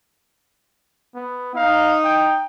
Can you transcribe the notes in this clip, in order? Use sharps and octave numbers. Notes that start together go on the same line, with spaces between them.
B3
D#4 F5
G5